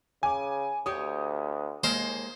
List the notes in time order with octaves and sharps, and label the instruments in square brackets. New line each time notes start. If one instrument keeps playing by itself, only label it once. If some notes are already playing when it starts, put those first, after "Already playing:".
[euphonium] C#3 [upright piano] G#5 D6
[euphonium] D2 [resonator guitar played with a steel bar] G4 C#5 [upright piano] D#6
[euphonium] D#2 [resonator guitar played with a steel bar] G#3 A#3 [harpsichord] C5